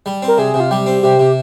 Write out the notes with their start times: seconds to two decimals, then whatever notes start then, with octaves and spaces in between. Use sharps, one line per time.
0.06 G3
0.22 C4
0.28 A#4
0.38 C3 G#4
0.54 C3
0.60 F4
0.71 G3 G4
0.86 C4
1.03 C3 G4
1.19 C3